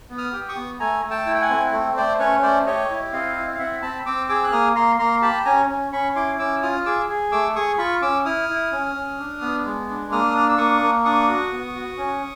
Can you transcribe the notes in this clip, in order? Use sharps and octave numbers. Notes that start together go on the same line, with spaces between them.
B3
D#6 F6
G4
C#6 D#6
B3
A3 G#5 A#5
A3
G5 A5
E4
G5
F#5 G#5
C4
A3
A3 C5 D5
C#4 B4 C#5
A3 C5 D5
G4 C#5 D#5
E4
C4 D#5 F5
E4
F5
C4 E5 F#5
C4 A5 B5
C4 D6 E6
G#4 D6 E6
F#6
A#3 D#6 F6
A#3 A#5 C6
A#3 A#5 C6
G4 A5 B5
C#4 G#5 A#5
C#4
C#4 B5 C#6
E4 C6 D6
C#4 D6 E6
F4 D#6 F6
G#4 D6 E6
G#4
A3 D6 E6
G#4 C#6 D#6
F4 B5 C#6
C#4 D6 E6
E4 D#6 F6
E4
C#4
C#4
D4
B3
G#3
D4
A#3 D#6 F6
D4 F6
E6
A#3 C#6 D#6
A#3
D4 C#6 D#6
F#4
B3
F#4
C#4